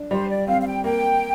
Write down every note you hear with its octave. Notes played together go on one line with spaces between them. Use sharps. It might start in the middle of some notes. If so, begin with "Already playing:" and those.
Already playing: D4
G3 C5
D5
C4 F5
F5
G5
A#3 G5